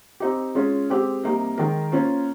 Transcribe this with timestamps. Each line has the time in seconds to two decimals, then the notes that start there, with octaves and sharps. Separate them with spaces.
0.20 C4 D#4 G4
0.55 G#3 C#4 F4
0.90 G#3 C4 G4
1.24 C3 G3 A#3 D#4 A#4
1.58 D#3 G#3 D#4 A#4
1.92 A#3 C#4 F4 C5